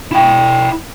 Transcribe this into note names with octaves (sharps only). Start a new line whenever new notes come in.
E4 G5